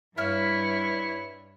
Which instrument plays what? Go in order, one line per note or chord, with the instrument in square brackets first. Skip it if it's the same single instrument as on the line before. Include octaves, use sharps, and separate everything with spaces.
[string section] G2 [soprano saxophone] E4 [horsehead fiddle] B4 C#5 [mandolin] E5 F5 F6